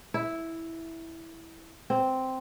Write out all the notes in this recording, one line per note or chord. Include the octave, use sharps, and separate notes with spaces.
E4
C4